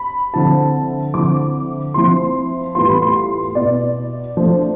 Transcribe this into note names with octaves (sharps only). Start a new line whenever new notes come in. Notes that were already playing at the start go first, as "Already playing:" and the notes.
Already playing: B5
D3 F3 C4 E4 A5
D3 F3 C4 E4 D6
F3 C4 E4 C6
A2 E3 G3 B3 F4 C6
B5
C6
B2 B3 E4 D5
F3 A3 D4 C5